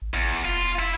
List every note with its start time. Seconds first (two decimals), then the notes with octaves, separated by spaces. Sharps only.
0.02 A1
0.14 A1 E2
0.45 F1 F4
0.80 E4